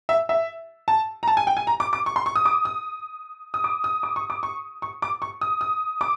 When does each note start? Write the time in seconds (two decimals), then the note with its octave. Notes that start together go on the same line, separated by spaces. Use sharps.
0.09 E5
0.29 E5
0.88 A5
1.23 A#5
1.28 A5
1.37 G#5
1.47 G5
1.57 G#5
1.67 A#5
1.80 D6
1.93 D6
2.06 C#6
2.16 C6
2.26 C#6
2.36 D#6
2.45 D6
2.65 D#6
3.54 D#6
3.64 D6
3.84 D#6
4.03 D6
4.16 C#6
4.30 D6
4.43 C#6
4.82 C#6
5.02 D6
5.22 C#6
5.41 D#6
5.61 D#6
6.01 D6